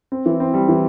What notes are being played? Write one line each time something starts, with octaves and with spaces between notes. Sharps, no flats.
C4
E3
C4
G3
E3